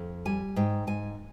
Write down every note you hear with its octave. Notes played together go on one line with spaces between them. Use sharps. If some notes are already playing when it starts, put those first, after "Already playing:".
Already playing: F2
G3 G#5
G#2 G5
G#2 G#5